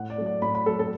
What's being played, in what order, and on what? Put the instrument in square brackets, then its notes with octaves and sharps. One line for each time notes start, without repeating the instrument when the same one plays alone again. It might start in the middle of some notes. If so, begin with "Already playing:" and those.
Already playing: [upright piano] A2 F#5
D5
F#3 A3
D5
A2 B5
B5
F#3 A3 A4
A4